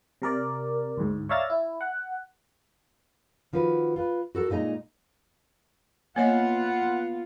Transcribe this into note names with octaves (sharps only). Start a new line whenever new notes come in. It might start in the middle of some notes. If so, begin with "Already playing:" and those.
C3 A#4 D5
D2 G#2
C#5 D5 E5 F5 A#5 A6
E4
F#5
D#3 F3 F#4 B4
F4 B4
F#4 A4 A#4
A#2 G#3 D#4 D#5 A#5
A#3 B3 F4 C#5 D#5 F#5